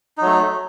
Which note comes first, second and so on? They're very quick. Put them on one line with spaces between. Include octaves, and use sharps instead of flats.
D#4 F#3 A3